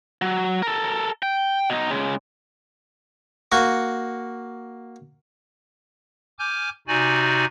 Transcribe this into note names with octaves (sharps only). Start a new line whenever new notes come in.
F#3
A4 A#4
G5
B2 D#4
C#3 G#3
A#3 F#4 C#6
G#5 D6 F6 G6
C3 D#4 F#4 D5 G#5